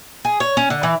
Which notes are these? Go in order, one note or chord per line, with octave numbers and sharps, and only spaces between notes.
G#4
C#5
C#4
D3
E3